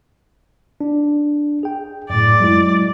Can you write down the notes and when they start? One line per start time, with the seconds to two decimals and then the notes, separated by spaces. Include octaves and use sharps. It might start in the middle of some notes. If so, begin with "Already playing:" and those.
0.81 D4
1.63 G#4 G5
2.10 F#2 A2 D5
2.40 F#3 G#3 E4